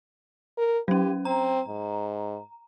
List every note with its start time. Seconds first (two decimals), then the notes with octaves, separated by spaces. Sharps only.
0.58 A#4
0.88 F#3 C#4 G4
1.25 C4 A#5
1.69 G#2